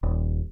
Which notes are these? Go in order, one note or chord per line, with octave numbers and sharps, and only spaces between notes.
D#1